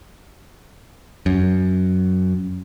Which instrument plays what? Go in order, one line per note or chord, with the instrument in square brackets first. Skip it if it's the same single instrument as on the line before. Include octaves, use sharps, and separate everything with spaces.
[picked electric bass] F#2